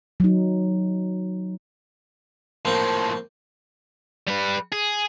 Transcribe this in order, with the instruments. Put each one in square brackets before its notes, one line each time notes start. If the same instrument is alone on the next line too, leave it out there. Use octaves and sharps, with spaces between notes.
[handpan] F#3 D#4
[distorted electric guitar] A2 F3 [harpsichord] A#3 C4
[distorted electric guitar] G3 B4
G#4